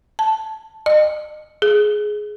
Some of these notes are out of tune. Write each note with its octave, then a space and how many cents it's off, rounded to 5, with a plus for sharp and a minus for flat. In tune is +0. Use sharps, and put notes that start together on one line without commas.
A5 -5
D#5 -35
G#4 +10